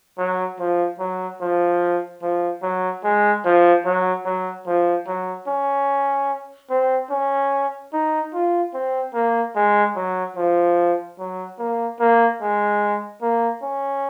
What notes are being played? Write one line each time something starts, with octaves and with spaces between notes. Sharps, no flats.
F#3
F3
F#3
F3
F3
F#3
G#3
F3
F#3
F#3
F3
F#3
C#4
C4
C#4
D#4
F4
C4
A#3
G#3
F#3
F3
F#3
A#3
A#3
G#3
A#3
C#4